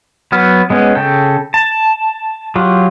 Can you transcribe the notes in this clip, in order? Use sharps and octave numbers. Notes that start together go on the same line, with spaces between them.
F#3 B3 F6
G#3 B3 C#4
C#3 A4 G5
A5
F#3 F4 G4